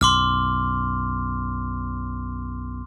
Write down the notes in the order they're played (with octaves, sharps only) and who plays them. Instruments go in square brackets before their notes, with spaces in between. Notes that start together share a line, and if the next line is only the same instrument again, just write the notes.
[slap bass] B1 F#2 [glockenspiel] C6 D6 F6